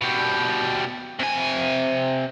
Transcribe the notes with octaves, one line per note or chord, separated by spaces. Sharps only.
B2 G3
C3 G#5